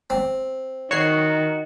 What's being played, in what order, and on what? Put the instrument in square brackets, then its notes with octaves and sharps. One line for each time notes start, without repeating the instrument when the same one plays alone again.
[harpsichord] C4
[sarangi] D#3 [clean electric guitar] F#4 [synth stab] C#5 C#6 C7